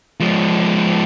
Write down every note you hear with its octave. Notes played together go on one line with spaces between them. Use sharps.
F3 G#3